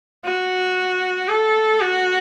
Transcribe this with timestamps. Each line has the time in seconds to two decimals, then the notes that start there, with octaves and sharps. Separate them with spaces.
0.24 F#4
1.28 A4
1.80 F#4